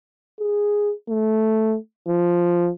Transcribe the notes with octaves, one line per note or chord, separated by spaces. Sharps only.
G#4
A3
F3